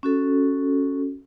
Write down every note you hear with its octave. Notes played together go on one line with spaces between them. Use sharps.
C#4 F#4 A4